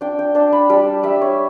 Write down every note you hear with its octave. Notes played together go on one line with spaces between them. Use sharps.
D4 G5
G5
D4 A5
B5
G3 A5
G3 E5
C#5